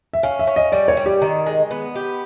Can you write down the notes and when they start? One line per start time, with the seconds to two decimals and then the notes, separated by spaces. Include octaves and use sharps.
0.13 E5
0.23 C#4 F5
0.39 E5
0.47 C#4
0.56 D#5
0.72 G3 D5
0.88 C#5
0.97 G3
1.06 G4
1.22 D#3
1.46 G#3
1.71 B3
1.95 G4